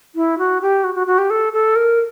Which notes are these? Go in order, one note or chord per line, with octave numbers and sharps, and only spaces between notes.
E4
F#4
G4
F#4
F#4
F#4
G4
A4
A4
A#4